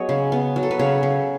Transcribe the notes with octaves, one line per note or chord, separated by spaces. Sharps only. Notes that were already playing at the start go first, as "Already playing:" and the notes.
Already playing: F#3 B3 G#4 C#5 D#5
C#3
B3
F#3
A4
B4
C#3 C#5
C#3